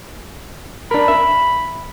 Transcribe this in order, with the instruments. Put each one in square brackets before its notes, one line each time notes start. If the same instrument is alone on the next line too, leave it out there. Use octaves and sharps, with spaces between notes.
[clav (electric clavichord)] D4 A#4 [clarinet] B5
[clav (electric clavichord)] E5